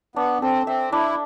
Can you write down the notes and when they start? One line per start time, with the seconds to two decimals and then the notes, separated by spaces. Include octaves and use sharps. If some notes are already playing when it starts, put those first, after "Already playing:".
0.15 B3 D4
0.42 C4 A4
0.67 C4 E5
0.92 D4 E4